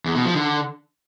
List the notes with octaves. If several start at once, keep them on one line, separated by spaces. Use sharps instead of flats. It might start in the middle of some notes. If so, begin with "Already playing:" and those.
E2
B2
F3
D3